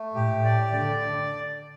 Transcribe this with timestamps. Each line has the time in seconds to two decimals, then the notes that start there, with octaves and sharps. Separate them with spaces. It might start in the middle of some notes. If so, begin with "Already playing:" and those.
Already playing: A3
0.14 A2 G4
0.44 D5
0.73 D3 D5